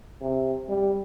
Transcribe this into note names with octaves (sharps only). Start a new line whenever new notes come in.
C3
G3